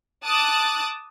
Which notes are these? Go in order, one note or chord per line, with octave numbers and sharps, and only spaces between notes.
A5 D6 D#6 F#6 A6